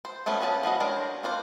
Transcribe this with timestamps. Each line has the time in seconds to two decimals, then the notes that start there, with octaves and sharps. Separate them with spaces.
0.05 C5
0.26 F3 A3 B3 C#4 G#4
0.41 B3 C#4 G#4 F#5 A5
0.63 F3 B3 F#4 D#5
0.80 G#3 D4 A#4 C5 C#5
1.23 C4 D4 F4 C5